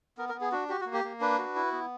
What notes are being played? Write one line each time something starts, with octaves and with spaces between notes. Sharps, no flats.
B3 A#4
A#4
B3
G#4
D4 F#4
F#4 G4
F#4
A#3
G4
A#3
D4 B4
F#4
E4
B3